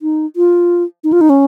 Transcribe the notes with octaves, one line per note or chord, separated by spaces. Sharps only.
D#4
F4
D#4
F4
D#4
C#4